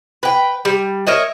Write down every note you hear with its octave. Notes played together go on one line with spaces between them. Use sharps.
B4 G5
G3
A#4 C#5 D#5 E5